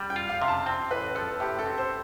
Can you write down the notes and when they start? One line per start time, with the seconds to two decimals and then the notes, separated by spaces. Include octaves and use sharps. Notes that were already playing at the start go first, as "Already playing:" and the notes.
Already playing: G3 G5
0.10 G5
0.16 F4
0.29 F5
0.42 C3
0.48 A5
0.66 C4 G5
0.91 A1 B4
1.15 F3 A4
1.40 A2 G4
1.59 A4
1.66 C4
1.78 C5